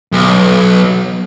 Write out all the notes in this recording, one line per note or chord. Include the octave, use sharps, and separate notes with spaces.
B1